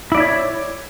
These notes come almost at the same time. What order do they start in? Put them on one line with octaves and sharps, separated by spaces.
E4 D5 E5 C#5